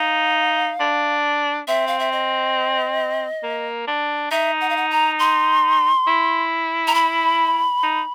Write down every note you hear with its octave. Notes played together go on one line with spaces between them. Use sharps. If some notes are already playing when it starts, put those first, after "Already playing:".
Already playing: D#4 F5
D4
C4 E5
F5
E5
D#5
A#3
D4
D#4 E5
F#5
F5
F#5
A#5
C6
E4
A#5
B5
D#4